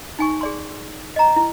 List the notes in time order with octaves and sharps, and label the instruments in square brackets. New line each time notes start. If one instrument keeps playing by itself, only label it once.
[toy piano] D#4 G#5 C#6
G#4 D5 C6
D#5 A#5
E4